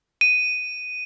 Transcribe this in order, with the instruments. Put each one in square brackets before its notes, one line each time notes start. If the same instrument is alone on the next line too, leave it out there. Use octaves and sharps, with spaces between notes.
[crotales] D#7